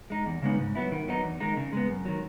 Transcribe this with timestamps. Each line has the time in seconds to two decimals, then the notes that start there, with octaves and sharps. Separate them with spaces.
0.10 G#3 D#4
0.26 E2
0.42 C#3 G#3 B3 D#4
0.59 G#2
0.75 F#3 B3 E4
0.92 D#3
1.08 F#3 B3 D#4
1.24 E2
1.40 D#3 G#3 D#4
1.57 C#3
1.73 G#3 B3
1.89 F#2
2.05 D#3 F#3